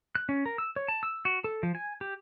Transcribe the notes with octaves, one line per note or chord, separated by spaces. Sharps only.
F#6
C#4
A#4
E6
C#5
A5
E6
F#4
A4
F3
G#5
G4